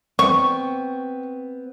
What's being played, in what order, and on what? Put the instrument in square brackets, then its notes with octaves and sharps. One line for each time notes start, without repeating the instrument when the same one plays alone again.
[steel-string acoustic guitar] B3 C4 [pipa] C#6